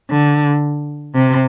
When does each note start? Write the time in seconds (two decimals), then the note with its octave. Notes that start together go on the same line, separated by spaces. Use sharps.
0.10 D3
1.15 C3